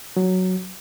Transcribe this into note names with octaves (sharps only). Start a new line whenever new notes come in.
F#3